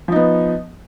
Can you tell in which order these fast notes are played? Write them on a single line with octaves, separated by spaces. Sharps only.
F3 D#4 B3